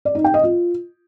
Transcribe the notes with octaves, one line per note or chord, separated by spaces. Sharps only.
D5
D#4
G5
D#5
F4